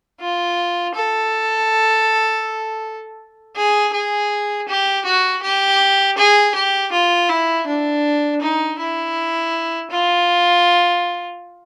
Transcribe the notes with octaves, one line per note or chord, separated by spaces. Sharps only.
F4
A4
G#4
G#4
G4
F#4
G4
G#4
G4
F4
E4
D4
D#4
E4
F4